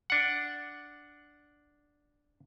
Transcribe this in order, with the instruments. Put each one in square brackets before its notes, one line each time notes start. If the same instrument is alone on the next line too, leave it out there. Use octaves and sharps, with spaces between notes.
[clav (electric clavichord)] D4 F#5